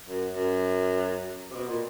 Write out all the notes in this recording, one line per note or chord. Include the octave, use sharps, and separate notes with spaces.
F#2
F#2
C3
B2
A#2